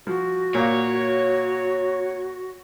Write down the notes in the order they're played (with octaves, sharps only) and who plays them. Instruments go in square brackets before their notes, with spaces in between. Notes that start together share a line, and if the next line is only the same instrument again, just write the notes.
[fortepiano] F3 [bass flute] F#4
[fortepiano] A#2 F5 [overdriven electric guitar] C#5